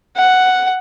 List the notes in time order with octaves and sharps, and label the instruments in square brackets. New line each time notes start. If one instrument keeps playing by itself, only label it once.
[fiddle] F#5